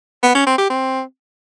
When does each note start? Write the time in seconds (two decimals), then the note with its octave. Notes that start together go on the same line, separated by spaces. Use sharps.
0.23 B3
0.35 C#4
0.47 C4
0.58 G4
0.70 C4